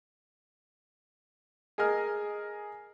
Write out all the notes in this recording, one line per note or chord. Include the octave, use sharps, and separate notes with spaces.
G#4 A#4 D#5 G#5 F6